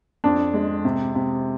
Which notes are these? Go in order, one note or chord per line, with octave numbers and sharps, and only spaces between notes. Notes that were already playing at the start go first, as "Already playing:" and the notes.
F2 D4
G#3
C3
C3